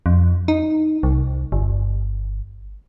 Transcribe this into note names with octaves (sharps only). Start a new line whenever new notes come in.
F2
D#4
C2
G1